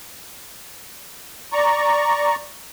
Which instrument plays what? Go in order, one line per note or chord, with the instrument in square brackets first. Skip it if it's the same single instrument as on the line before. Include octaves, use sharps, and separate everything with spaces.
[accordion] D5 A#5 C#6